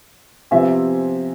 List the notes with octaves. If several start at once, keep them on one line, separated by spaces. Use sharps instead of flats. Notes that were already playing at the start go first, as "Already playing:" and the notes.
C3 F3 B3 E5 G#5